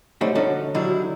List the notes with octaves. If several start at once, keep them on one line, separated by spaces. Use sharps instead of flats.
G3 A3 C4 C#4 D#4 F#4
D3 F3 C#4 D#4 F#4 A4
D3 D#3 F#3 G3 E4